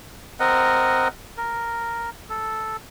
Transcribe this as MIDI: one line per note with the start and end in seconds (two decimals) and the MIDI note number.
0.40 1.08 60
0.40 1.08 70
0.40 1.08 75
0.40 1.08 78
1.37 2.10 70
2.30 2.77 69